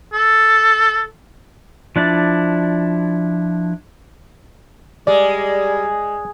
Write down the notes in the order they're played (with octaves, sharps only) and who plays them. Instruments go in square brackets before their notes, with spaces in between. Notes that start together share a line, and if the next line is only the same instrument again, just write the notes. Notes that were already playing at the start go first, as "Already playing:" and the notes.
[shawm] A4
[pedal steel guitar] F3 D4 E4 D5
[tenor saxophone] G3 [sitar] G#3 [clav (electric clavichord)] D5